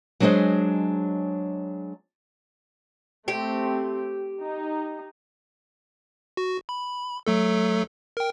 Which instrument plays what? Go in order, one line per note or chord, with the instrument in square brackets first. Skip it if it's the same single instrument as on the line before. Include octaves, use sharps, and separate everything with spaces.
[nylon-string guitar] F#3 G#3 D4 G#4 C5 D#5
[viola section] A3 C4 [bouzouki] G4
[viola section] D#4
[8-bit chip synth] F#4
B5
F#3 A3 A4
A#4 G5